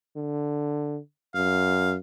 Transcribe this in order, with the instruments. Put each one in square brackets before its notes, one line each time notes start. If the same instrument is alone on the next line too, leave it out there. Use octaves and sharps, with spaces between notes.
[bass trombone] D3
[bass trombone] F#2 [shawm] F5